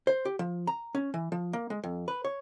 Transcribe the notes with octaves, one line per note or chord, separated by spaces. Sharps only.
C5
G4
F3
A#5
C#4
E3
F3
A#3
G#3
F2
B4
C#5